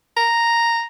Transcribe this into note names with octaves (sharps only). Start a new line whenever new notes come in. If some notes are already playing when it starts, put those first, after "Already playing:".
A#5